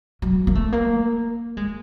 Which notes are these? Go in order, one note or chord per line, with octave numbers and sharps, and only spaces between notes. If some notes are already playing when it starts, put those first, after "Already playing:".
F#3
A#3
A3
A#3
G#3